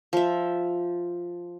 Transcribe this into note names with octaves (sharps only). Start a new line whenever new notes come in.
F3 E5